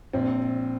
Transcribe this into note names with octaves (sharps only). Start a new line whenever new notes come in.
A#1 C4